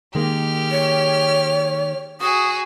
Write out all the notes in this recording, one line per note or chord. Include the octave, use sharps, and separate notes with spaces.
D#3 G#3 A#3 G4 F6
C#5
F#4 G#4 D#6